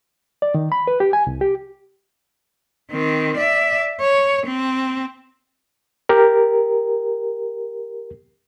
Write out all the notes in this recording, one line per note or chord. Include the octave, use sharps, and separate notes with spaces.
D5
D#3
B5
B4
G4
G#5
C2
G4
D#3 C4
D5 E5
C#5
C4
G4 A#4